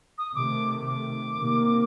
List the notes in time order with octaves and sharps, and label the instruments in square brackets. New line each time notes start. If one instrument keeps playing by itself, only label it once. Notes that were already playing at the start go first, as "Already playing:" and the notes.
[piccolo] D#6
[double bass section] C3 D#3 A3 [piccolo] D6
[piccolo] D6
[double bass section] C3 D#3 A#3